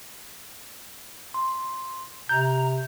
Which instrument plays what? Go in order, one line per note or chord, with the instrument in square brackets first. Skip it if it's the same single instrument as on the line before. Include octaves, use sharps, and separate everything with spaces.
[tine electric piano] C6
[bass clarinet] C3 [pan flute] A#5 [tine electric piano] G6